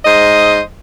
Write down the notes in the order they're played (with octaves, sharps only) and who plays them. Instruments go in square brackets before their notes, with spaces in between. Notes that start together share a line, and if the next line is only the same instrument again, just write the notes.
[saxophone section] G#2 C5 D#5